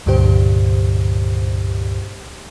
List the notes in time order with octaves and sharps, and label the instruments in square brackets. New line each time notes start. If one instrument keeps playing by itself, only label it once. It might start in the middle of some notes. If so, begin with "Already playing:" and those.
[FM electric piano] C#2 G2 A#2 D3 G4 C5